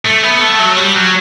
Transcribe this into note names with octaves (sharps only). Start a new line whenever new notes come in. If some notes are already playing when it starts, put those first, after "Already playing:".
A3
B3
A3
F#3
G3
F#3